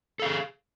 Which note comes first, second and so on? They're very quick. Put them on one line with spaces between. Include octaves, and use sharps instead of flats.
A4 F5 G#4